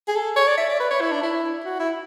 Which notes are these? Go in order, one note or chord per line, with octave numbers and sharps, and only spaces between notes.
G#4
A4
C#5
D5
E5
D5
B4
C#5
E4
D4
E4
F#4
E4